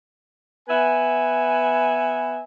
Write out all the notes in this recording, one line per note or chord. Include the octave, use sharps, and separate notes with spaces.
B3 B4 E5 G#5